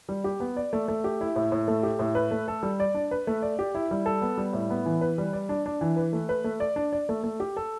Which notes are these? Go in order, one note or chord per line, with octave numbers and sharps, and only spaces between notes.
G3
G4
B3
D5
A3
A3
G4
E4
A2
A2
A3
G4
A2
B4
A3
A4
G3
D5
D4
B4
A3
D5
G4
E4
G3
A4
B3
G3
A2
B3
E3
B4
G3
D5
D4
D4
E3
B4
A3
B4
A3
D5
D4
D5
A3
A3
G4
A4